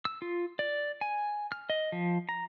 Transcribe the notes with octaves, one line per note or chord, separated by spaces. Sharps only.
E6
F4
D5
G#5
F6
D#5
F3
A#5